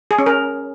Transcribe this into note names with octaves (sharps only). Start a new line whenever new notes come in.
G#4
C#4
A#4